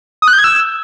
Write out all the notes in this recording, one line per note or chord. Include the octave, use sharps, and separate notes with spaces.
D#6
F#6
G6
G#6
E6